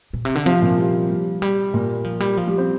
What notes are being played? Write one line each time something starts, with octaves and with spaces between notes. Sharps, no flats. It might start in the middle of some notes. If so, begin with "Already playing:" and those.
A#2
C3
D3
C3 F3 C4
A#2 A#3
G3
G3
G3
A#2 A#3
F3
G3
F3
G3 G4
C4 C5